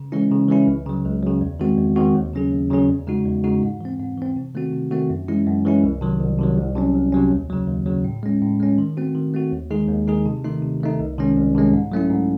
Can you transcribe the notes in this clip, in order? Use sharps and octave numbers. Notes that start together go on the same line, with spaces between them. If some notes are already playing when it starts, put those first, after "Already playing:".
Already playing: C#3
E3 G#3 C#4 E4
C#3
E3 G#3 C#4 E4
C#2
C#3 F#3
C#2
C#3 F#3
E2
D#3 G#3 C4 F#4
E2
D#3 G#3 C4 F#4
D#2
C#3 F#3 C#4 G#4
D#2
C#3 F#3 C#4 G#4
E2
C#3 G#3 D#4 F#4
E2
C#3 G#3 D#4 F#4
G#2
E3 C4
G#2
E3 C4
C3
D#3 A3 C4 F#4
C3
D#3 A3 C4 F#4
F#2
E3 G#3 C#4 E4
F#2
E3 G#3 C#4 E4
C2
C3 D#3 F#3
C2
C3 D#3 F#3
C2
C3 F#3 C#4
C2
C3 F#3 C#4
D#2
C#3 F#3
D#2
C#3 F#3
A2
G#3 C#4
A2
G#3 C#4
D#3
A3 C4 F#4
D#3
A3 C4 F#4
D#2
D#3 G#3 D#4 G#4
D#2
D#3 G#3 D#4 G#4
C3
D#3 A3 D#4
C3
D#3 A3 D#4
C2
C3 D#3 G#3 C#4
C2
C3 D#3 G#3 C#4
G#2
F#3 A3 C#4 E4
G#2